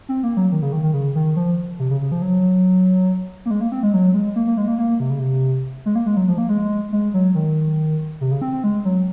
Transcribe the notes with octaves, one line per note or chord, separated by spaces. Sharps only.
C4
A#3
F#3
D#3
C#3
D#3
D#3
C#3
D#3
F3
C3
C#3
C#3
F3
F#3
A#3
G#3
A#3
C4
G#3
F#3
G#3
A#3
A#3
G#3
A#3
A#3
C3
C#3
C3
G#3
A#3
G#3
F#3
F3
A#3
G#3
G#3
F#3
D#3
C3
C#3
C4
C4
G#3
F#3